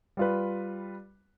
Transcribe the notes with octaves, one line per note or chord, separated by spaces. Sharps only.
G3 F4 B4